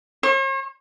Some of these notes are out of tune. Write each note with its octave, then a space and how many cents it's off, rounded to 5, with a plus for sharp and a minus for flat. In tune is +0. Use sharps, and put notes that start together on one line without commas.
C#5 -45